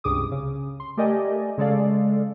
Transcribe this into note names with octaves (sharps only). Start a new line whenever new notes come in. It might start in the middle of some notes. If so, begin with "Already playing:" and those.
C#2 G2 C3 G#4 D6 D#6
C#3
C6
A3 G4 A#4 D5 D#5 G#5
C#3 G#3 A4 D5 F5